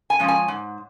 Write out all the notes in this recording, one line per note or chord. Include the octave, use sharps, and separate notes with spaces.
G#5
F3 G#3 C#4
G#5
G#2